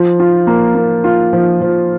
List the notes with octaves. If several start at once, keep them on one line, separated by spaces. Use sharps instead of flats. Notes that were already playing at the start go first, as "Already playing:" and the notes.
Already playing: F3
F4
A#3
A#3
F4
F3
F3